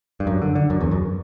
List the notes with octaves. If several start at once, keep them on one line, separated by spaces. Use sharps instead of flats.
G2
F#2
D3
D3
F#2
E2
F#2